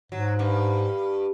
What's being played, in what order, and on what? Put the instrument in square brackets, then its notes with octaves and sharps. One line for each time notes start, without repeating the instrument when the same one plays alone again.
[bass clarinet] G#2 [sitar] F#3
[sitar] G2